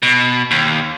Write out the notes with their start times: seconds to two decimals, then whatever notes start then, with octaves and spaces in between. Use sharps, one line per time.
0.03 B2
0.51 D#2